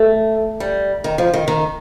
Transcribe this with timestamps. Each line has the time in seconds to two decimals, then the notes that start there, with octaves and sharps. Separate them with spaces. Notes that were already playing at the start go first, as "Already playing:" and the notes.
Already playing: A3
0.60 G3
1.04 D#3
1.18 F3
1.34 D#3
1.48 D#3